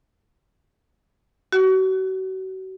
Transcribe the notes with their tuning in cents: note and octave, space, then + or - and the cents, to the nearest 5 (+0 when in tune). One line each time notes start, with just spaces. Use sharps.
F#4 +35